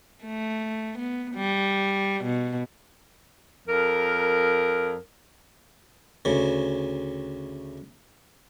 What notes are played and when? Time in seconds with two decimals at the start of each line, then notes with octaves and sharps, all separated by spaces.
0.24 A3
0.99 B3
1.35 G3
2.24 B2
3.67 F2 A#4
6.25 D2 C#3